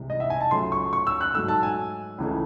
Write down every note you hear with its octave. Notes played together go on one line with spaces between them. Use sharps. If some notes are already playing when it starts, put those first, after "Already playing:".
Already playing: C2 C3 E3 G#3
D#5
E5
G#5
A5
C#2 C#3 F#3 A3 C6
C#6
C#6
E6
F#6
G#2 F#3 A3 E6
A5
G#5
C#2 C#3 E3 A3